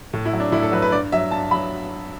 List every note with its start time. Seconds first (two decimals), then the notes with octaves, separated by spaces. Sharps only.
0.13 A2
0.25 E4
0.33 F#3
0.40 D4
0.52 A2 E4
0.62 A4
0.72 F#3 B4
0.82 B4
0.92 G2 D5
1.12 F#3 E5
1.31 G2 A5
1.51 F#3 B5